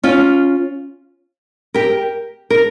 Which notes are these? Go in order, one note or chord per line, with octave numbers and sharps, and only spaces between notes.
C#4 F4
G4 A#4
A#4